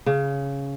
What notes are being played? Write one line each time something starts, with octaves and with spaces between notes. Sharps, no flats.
C#3